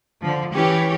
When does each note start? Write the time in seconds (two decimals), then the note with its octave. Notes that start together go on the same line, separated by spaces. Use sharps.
0.21 D3 F3
0.54 E3 C#4 G4 C#5